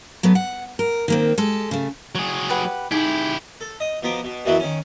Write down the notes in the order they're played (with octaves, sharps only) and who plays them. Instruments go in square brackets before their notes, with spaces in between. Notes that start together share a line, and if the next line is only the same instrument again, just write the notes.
[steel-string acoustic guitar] F#3 A3 B3
F#5
A#4
D#3 A#3 C4
G#3 G4 A4
C#3 A3
[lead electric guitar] F#3 G#4 [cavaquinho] C#6
[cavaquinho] G4 B4 F#5
[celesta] D#4 [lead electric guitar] E4 G4 [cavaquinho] G#4
[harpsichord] A4
D#5
B2 F3 B3 A#5 D6
B2
F#2 B2 E3 F#3 E4 F#4
D#3 C#4